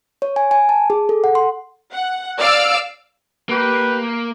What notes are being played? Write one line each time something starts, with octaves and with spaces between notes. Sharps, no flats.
C#5
G#5
G#5
A5
G#4
A4
F#5
C6
F#5
D5 F5 E6 F6 D7
A#3 G4 B4